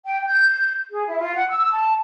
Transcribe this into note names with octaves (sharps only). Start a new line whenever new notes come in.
G5
G6
G#4
E4
F4
F#5
E6
A5